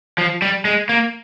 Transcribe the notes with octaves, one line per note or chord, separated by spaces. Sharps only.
F3
G3
G#3
A#3